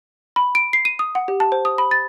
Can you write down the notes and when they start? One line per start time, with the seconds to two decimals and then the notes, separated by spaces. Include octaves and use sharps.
0.36 B5
0.55 D7
0.73 C7
0.85 D#7
0.99 D#6
1.15 F#5
1.28 G4
1.40 A5
1.52 C5
1.65 D#6
1.78 B5
1.91 A6